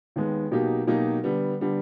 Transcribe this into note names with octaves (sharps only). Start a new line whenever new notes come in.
D#2 D#3 G#3 B3
B2 F#3 A#3 D#4 G4
B2 F#3 A#3 D#4 G4
D3 G3 B3
D3 G3 B3